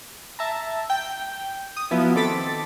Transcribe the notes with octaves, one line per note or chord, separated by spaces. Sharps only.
E5 A5 A#5
G5
D#6
F3 F#3 B3 E4
D#3 C4 A4 D6 A6 B6